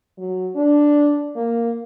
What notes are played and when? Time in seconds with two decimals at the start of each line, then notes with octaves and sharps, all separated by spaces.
0.18 F#3
0.56 D4
1.36 A#3